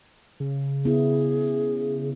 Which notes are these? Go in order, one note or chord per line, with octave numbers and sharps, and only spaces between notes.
C#3
B3 E4 G#4